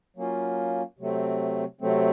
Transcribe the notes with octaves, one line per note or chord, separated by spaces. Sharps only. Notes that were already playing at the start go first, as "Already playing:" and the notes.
F#3 A#3 C#4 F4
C3 F#3 A3 C4
C3 F#3 A3 C4